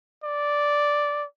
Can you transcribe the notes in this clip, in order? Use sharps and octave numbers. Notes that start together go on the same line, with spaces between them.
D5